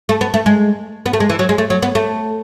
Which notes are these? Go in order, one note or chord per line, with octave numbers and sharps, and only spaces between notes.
A3
B3
A3
G#3
B3
A3
G#3
E3
F#3
G#3
A3
F#3
B3
A3